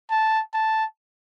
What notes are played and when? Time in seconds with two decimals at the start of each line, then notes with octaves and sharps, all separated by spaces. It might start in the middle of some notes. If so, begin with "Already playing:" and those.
0.11 A5
0.54 A5